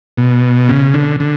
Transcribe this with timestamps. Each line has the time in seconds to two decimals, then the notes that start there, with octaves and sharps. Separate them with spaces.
0.17 B2
0.69 C#3
0.94 D3
1.20 D3